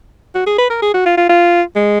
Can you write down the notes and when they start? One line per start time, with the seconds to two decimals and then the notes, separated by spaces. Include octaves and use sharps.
0.35 F#4
0.47 G#4
0.59 B4
0.70 A#4
0.82 G#4
0.94 F#4
1.06 F4
1.18 F4
1.29 F4
1.76 G#3